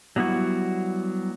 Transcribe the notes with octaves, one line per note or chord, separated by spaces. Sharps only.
F#3 G3 B3 E4 F#4